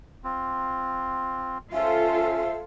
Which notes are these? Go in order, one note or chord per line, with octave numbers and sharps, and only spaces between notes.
C4 F4
C#4 F4 A4 C5 E5